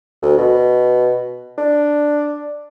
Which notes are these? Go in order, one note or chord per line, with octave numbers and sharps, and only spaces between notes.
D2
B2
D4